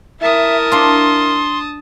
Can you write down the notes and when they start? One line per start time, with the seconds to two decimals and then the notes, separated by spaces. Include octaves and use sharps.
0.21 E4 A#4 E5 A5 D#6
0.72 D4 F4 C6